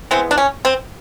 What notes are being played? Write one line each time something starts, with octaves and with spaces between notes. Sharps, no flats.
E3 G#3 B3 C4
D4
C#4
C4